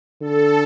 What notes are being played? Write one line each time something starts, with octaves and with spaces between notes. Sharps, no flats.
D3 A4